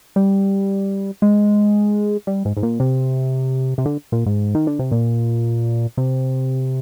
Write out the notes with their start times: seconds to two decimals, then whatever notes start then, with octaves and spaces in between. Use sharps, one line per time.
0.16 G3
1.22 G#3
2.27 G3
2.45 G#2
2.57 G#2
2.63 A#2
2.80 C3
3.78 C3
3.86 D3
4.12 A#2
4.26 G#2
4.55 D#3
4.67 D3
4.79 C3
4.92 A#2
5.97 C3